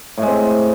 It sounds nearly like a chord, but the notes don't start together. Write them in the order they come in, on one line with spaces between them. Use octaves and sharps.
A2 G#3 C4